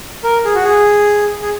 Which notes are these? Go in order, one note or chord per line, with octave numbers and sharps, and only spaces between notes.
A#4
G#4
F#4
G#4
G#4